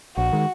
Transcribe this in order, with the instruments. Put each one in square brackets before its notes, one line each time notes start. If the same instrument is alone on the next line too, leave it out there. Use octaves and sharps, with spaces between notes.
[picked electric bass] A#1 [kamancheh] F#4
[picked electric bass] D#3 G#3